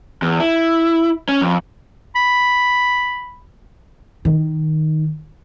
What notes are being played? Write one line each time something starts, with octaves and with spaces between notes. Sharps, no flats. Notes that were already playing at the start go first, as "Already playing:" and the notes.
E2
E4
C#4
F2
B5
D#3